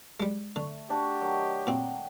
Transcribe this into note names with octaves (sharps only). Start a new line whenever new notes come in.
G3 G#3
D3 A3
D4 F#4 G4 F#5 A5
D#3 F#3
A#2 C4 G5